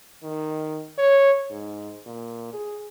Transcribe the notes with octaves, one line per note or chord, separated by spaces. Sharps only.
D#3
C#5
G#2
A#2
G#4